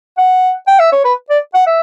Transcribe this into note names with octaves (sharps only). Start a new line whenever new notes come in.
F#5
G5
E5
C#5
B4
D5
F#5
E5